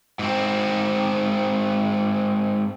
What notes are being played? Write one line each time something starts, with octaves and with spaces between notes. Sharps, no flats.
G#2 C4